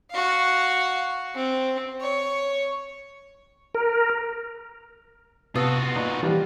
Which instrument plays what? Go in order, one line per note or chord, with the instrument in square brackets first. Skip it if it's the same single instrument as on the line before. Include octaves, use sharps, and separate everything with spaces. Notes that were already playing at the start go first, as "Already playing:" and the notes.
[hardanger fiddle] F#4 F5
C4
C#5
[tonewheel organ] A#4
[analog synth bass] C3 [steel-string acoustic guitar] B3 [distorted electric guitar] F4 F#4 [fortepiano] A5 D#6 E6
[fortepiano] A#2 [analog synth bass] D#4
[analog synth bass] E3 [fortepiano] F3 G3 G4